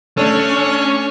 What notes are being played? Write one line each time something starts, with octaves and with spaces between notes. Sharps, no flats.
A3 C#4 D4 A4 C#5